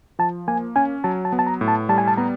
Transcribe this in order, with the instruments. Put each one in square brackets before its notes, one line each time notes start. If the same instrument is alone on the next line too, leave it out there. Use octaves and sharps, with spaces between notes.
[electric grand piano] F3 [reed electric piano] A5
[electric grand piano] A#3 [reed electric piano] G#5
[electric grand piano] C#4 [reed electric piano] G#5
[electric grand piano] F#3 [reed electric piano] A5
[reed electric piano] A5
[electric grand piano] B3
[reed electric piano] A5
A#5
[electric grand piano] A2
[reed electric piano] A5
[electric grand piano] G3 [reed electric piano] A5
[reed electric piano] G#5
A5
[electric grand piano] B3 [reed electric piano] A#5